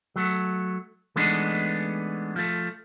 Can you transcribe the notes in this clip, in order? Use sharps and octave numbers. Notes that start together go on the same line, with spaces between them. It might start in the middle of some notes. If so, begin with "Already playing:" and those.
F#3 A3
E3 G#3 A3 B3 D4 D#4
F3 A3